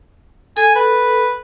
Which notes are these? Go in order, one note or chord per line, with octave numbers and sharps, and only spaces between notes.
A4 G#5
B4